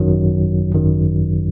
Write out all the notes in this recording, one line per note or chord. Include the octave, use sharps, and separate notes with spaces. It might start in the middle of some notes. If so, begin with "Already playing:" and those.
Already playing: G#1 F#2 D#3 F#3
G#1 F#2 D#3 F#3